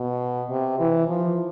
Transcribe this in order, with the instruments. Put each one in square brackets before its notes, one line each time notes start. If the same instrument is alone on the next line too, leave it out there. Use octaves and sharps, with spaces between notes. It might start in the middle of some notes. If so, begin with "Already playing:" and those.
Already playing: [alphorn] B2
C3
E3
F3